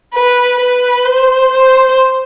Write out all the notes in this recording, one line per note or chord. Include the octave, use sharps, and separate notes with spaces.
B4
B4
C5
C5